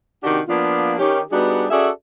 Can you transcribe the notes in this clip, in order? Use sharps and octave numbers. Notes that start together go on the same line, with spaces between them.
C3 D#3 D4 F#4 G4
F3 A#3 B3 D4 F4
D#3 C#4 G4
G3 B3 D4 D#4 F#4 G#4
C#4 F#4 G#4 A4 D5 E5